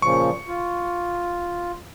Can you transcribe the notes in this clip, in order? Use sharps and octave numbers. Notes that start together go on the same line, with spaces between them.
A#2 C#3 F3 C#6
F4